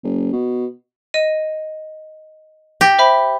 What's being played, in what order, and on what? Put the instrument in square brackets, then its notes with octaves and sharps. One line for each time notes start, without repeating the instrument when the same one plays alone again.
[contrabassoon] F#1
B2
[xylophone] D#5 D#7
[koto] G4 [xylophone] A#6
[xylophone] C5 E5 B5